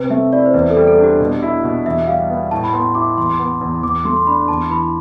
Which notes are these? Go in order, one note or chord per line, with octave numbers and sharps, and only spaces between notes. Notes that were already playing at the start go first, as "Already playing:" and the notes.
Already playing: C3 B4
A3 E5
E4 D5
C5
E2 B4
A4
G3
A4
D4 G4
B2
E4
B2
E2 E5
G3 F5
B3
A2 A5
B5
B3 C6
E4 D6
E2 C6
B3
E2
E2 D6
A3 C6
C6
D4 B5
E2 A5
E3 B5